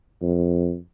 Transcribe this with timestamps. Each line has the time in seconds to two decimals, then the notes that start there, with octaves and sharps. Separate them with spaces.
0.22 F2